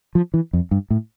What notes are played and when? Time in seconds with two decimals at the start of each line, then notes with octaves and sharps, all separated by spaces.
0.15 F3
0.34 E3
0.53 F2
0.71 G2
0.90 A2